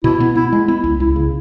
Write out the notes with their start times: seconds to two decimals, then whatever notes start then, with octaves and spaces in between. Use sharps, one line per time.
0.04 B2 E4
0.20 B3
0.35 B3 E4
0.53 G#3
0.67 B3 E4
0.84 C#2
1.00 C#2 E4
1.16 C#3